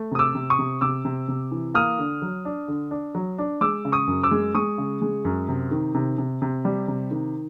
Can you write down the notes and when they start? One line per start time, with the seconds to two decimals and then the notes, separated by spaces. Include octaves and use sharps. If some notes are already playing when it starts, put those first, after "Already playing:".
Already playing: A3
0.12 C3 D#6
0.19 D6 E6
0.35 C3
0.50 C#6 D#6
0.59 C3
0.81 C3 D6 E6
1.05 C3
1.28 C3
1.51 E3
1.74 A#3 D#6 F6
1.99 D3
2.22 F#3
2.45 D4
2.68 D3
2.91 D4
3.15 F#3
3.38 D4
3.61 G#3 D6 E6
3.85 C#3
3.92 C#6 D#6
4.07 F#2
4.23 D6 E6
4.31 G#3
4.55 G#3 C#6 D#6
4.78 C#3
5.02 G#3
5.25 F#2
5.48 C3
5.71 D#3
5.95 C3
6.18 C3
6.42 C3
6.65 G3
6.88 C3
7.11 D#3